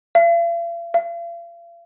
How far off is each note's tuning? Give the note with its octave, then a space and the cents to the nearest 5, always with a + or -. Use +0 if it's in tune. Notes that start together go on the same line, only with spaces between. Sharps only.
F5 -45
F5 -40